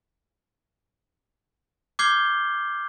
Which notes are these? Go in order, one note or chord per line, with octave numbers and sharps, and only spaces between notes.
D6 F6 G6 G#6 C7 G7